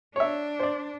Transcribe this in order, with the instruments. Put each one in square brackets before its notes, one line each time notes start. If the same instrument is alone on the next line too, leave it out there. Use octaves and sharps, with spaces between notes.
[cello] D4 [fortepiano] C#5 E5
[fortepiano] C5 D5